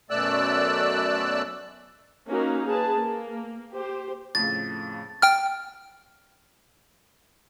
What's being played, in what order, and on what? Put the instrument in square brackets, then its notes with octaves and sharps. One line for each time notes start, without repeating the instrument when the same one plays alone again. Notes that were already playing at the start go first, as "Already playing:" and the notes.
[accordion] F#2 B2 A3 D5 E6 F#6
[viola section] A#3 C#4 D#4 F#4 A#4 F5
G#4 B4 A5
A#3
G4 C5
[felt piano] F2 A2 C#3 [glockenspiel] A6
[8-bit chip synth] G5 F6